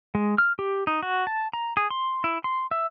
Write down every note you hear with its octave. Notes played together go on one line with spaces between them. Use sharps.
G#3
F6
G4
D#4
F#4
A5
A#5
G#4
C6
E4
C6
E5